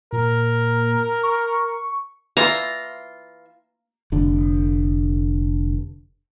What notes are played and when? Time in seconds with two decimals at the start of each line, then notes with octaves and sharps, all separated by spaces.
0.12 A#2 A#4
1.23 C#6
2.37 E3 E4 F4 A#5
4.12 F1 D3